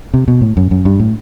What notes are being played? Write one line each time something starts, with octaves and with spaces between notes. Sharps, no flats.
C3
B2
A2
F#2
F#2
G2
A2